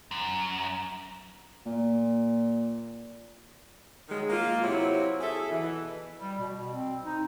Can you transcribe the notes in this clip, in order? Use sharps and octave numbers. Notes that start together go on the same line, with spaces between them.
F#2
A#2
D#3 F#3 G#3
A#3 F4
C3 F#3 E4
G#4 A4 E5
B2 E3
G3
B2
C4
D#4